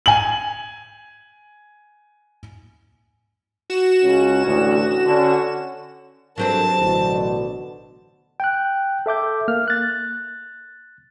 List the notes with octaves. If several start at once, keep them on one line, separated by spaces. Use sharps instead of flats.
G#5 F#7
F#4 E7
C#2 C#4
A1 D2
D3 C#4
G2 C3 F#3 C4 A4 A#4 C5 A5
A1 B2 D3
G5 F#6
A4 E5 D6 G6
A#3 F6
F#6 A6